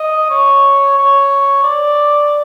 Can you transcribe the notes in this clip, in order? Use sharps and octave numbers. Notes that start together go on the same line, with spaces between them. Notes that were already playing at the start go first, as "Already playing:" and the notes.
Already playing: D#5
C#5
C#5
D5